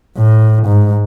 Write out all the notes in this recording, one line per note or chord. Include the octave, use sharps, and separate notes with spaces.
A2
G#2